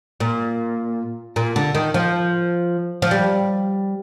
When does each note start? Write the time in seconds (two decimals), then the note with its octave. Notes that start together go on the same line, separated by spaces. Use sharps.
0.20 A#2
1.36 A#2
1.56 D3
1.75 D#3
1.94 F3
3.02 F3
3.11 G3